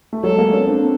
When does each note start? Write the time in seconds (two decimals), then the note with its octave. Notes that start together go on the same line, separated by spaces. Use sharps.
0.13 A3
0.23 F#3 G#3 A4
0.38 G#3 A#3
0.53 B3 C#4
0.67 C4 D4